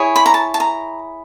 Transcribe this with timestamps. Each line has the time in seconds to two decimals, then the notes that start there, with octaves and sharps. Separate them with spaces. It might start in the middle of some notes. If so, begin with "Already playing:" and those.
Already playing: E4 G#4 C#5
0.16 B5
0.26 A#5
0.34 A5
0.54 A5
0.60 A#5